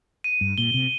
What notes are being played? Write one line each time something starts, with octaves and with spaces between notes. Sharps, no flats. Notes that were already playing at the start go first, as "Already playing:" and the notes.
D#7
G2
A#2 G7
C3